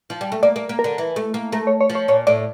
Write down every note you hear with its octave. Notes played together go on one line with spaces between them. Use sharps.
F3
G3
A3
A#3 D5
A#3
A#3
A#4
D3
E3
A3
A#3
A3 A#4
C#5
C#5
F3
C#5
A#2 C#5
A2 D5